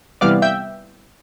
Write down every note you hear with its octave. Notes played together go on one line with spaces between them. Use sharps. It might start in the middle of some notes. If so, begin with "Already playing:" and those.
C3 E3 G3 B3 D5 F5
E5 G5